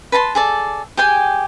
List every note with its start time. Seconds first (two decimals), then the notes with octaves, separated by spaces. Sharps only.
0.12 B4 A5 A#5 C6
0.35 G#4 A4 D5
0.97 G4 G#4 G5 G#5